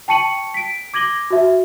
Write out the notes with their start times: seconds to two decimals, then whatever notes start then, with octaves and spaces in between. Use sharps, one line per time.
0.08 G5 A5 C#6 C#7 D#7 F#7
0.54 B6 D7
0.94 D6 G#6 A#6 F#7 G7
1.30 F#4 E5